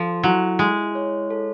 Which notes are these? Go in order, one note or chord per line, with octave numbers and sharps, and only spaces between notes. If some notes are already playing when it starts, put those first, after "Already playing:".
Already playing: F3 A4
F#3 E4
G#3 E4
C#5
A4